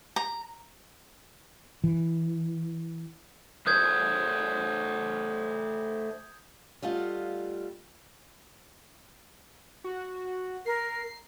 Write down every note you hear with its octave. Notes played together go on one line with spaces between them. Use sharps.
A#5
E3
A3 A#4 C5 D#6 G6 G#6
G3 A3 F4 D#5 F5 F#5
F#4
A#4 C7